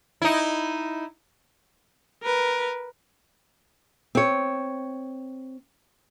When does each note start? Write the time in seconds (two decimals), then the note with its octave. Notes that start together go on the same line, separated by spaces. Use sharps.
0.22 D#4 E4
2.23 A#4 B4
4.15 C4 C#5